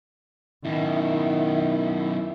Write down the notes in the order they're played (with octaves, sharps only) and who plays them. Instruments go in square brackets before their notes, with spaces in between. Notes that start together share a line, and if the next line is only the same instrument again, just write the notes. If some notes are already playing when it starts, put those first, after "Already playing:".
[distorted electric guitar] F#2 B2 [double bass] D#3 [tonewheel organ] E4